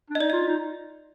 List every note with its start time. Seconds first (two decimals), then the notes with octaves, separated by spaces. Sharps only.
0.10 D4
0.15 D#5
0.20 D#4 D5
0.30 D#5
0.33 F4
0.48 D#4